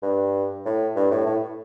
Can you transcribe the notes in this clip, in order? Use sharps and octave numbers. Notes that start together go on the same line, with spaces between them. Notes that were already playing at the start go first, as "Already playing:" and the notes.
G2
A2
G2
A2
A2